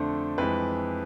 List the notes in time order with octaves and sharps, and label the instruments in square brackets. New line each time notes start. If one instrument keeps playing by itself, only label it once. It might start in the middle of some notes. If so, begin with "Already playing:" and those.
Already playing: [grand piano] F2 D3 A3 D4 C5
F2 E3 G#3 B4